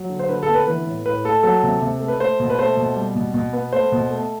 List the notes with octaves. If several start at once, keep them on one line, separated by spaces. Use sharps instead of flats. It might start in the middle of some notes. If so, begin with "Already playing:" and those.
Already playing: F#3
D3
C5
D3 B4
A4
B3
B4
E3 B4
A2
A2 B4
A3 A4
F#3 A4
C3
C3
A3
B4
A3 C5
B2
B4
A3 C5
B2
G3
B2
B2
B3
A3 C5
B2
A3